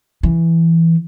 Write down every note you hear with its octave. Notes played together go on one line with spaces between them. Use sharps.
E3